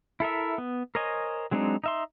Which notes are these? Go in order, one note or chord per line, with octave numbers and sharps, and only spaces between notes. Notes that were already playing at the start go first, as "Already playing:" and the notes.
E4 A4 A#4 E5
B3
A#4 C5 C#5 D#5 G#5
F#3 G#3 C4 D4 D#4
D#4 E5 C6